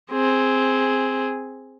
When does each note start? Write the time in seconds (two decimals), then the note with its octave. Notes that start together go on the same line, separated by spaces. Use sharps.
0.11 C4 G#4